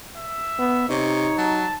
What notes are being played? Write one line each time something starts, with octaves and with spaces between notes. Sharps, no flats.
E5
B3
C3 D#4 C#5
F#3 A5